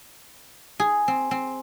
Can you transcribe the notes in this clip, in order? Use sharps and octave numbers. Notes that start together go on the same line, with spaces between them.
G#4
C4
C4